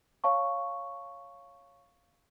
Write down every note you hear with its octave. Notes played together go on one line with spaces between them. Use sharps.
C#5 F5 A5 C#6